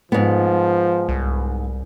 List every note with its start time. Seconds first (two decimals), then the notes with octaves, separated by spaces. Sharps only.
0.12 G#2 F3 B3
1.09 C2